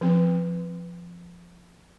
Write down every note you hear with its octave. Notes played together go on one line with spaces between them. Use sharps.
F3 C4